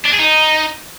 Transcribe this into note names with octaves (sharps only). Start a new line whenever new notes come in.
D4
G#4
D#4